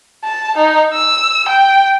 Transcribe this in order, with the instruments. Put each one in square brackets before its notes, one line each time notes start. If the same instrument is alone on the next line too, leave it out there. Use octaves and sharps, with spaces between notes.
[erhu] A5
D#4
E6
G5